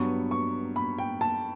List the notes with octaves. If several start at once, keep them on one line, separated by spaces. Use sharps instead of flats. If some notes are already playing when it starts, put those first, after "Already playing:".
Already playing: G2 F#3 B3 C#6
C#6
B5
G5
A5